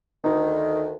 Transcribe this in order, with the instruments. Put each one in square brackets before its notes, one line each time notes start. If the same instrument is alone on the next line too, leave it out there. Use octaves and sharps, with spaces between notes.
[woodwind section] D2 D#3 [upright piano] D#4